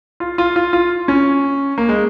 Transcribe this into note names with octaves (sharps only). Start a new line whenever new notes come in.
F4
F4
F4
F4
C#4
A#3
G#3